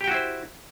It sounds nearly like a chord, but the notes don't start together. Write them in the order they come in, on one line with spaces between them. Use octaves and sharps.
G4 G5 F#4 E4 C5